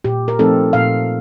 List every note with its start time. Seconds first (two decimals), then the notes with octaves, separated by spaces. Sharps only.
0.04 A#2 G4
0.28 A#4
0.39 F3 A3 C4 D#4 A4
0.73 A#2 F5